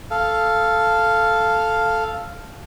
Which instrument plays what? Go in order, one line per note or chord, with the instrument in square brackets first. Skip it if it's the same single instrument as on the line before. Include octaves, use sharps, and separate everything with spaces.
[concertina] A4 F5